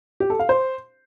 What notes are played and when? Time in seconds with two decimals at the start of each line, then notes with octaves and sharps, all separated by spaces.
0.20 G4
0.30 A4
0.39 F5
0.49 C5